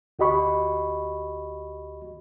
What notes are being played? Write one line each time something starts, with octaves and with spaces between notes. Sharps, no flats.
D2 F#4 G4 D#5 B5 C#6